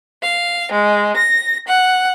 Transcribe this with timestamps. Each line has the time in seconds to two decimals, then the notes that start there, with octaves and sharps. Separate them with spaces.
0.22 F5
0.71 G#3
1.16 A#6
1.67 F#5